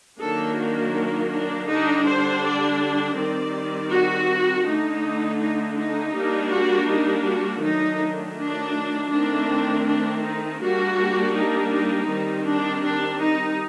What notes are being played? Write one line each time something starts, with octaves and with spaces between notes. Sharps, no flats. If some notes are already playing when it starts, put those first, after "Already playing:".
D#3 F#3 A#3 D4 A4
F#4
D4
D3 G3 D4 D#4
C5
D5
D5
D#3 G3 C4
F#4
D3 A3 D4 D#4
D#4
D#4
G3 A#3 D4
F#4
D#4
F#4
D#3 F#3 A3 D4 D#4
D4
D#3 A3 C4 D4
D4
D#4
G3 A#3 D4 F#4
D#4
D#4
D#3 G3 C4
D4
D4
D#4